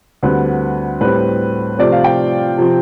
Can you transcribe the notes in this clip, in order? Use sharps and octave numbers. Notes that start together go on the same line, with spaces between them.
D2 D3 G3 C4 B4
A2 G3 C4 B4
C3 F3 A3 C4 D5
F5
G5
C3 F3 C4